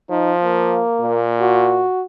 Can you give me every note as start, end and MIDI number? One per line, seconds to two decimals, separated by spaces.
0.10 0.82 53
0.10 0.32 63
0.44 1.24 58
1.01 1.85 46
1.41 2.04 66